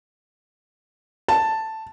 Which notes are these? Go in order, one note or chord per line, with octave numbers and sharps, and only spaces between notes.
A5